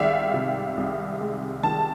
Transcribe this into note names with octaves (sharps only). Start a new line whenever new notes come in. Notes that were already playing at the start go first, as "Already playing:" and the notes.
Already playing: C2 D#3 G#3 D5 E5 F5
C3
C2
G#3
D#3 A5